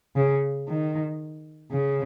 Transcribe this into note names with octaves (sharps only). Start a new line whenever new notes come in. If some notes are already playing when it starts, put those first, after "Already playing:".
C#3
D#3
C#3